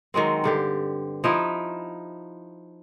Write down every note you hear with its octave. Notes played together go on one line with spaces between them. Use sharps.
D#3 F#3 G#3 C4
G2 D3 G4
F3 D#4 E4